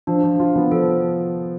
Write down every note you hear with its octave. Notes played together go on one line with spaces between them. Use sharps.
F3 D4
F3
F4
B3
F3 A4